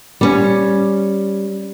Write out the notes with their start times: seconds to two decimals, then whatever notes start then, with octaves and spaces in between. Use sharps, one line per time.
0.21 G3 C#4